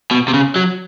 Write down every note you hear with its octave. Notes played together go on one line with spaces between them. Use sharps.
B2
C3
C#3
F#3